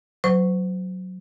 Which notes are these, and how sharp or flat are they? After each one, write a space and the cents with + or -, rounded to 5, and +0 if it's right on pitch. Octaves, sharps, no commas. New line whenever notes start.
F#3 +0 C5 -40 C#6 +0